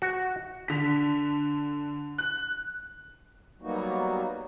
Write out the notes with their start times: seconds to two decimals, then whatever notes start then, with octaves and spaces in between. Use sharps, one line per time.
0.02 F#4
0.68 D3 B6
2.18 F#6
3.62 F#3 G3 A#3 B3 D#4 F#4